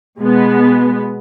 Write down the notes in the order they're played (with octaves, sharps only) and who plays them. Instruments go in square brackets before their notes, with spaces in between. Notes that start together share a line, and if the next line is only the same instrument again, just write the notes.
[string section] B2 G#3 B3